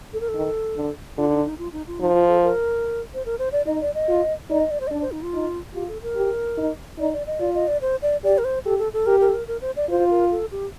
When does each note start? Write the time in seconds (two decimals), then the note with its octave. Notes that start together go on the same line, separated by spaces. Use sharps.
0.13 A4
0.21 A#4
0.28 A4
0.35 D#3
0.76 D3
1.17 D3 F4
1.31 D#4
1.45 D#4
1.58 F4
1.73 D#4
1.87 F4
2.00 F3 D#4
2.14 F4
2.28 A4
2.43 A#4
3.14 C5
3.26 A#4
3.39 C5
3.52 D5
3.66 D#4 D#5
3.81 D5
3.94 D#5
4.08 F4
4.50 D#4 D5
4.60 D#5
4.71 D5
4.80 C5
4.87 D#5
4.91 D4 D5
5.02 C5
5.12 D#4
5.22 F4
5.33 D#4
5.74 F4 G4
5.88 A4
6.02 A#4
6.16 G4
6.58 D#4
6.99 D#4 D5
7.13 D5
7.26 D#5
7.40 F4 D5
7.55 D#5
7.67 D5
7.81 C5
8.02 D5
8.23 G4 D5
8.38 A#4
8.44 C5
8.65 G4 A4
8.79 A4
8.93 A4
9.06 G4 A#4
9.21 A#4
9.28 A4
9.34 A#4
9.47 A#4
9.61 C5
9.76 D5
9.89 F4 C5
10.10 A#4
10.31 A4
10.52 G4